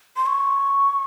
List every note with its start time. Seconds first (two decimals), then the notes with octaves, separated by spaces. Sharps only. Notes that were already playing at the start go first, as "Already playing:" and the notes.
0.17 C6
0.26 C#6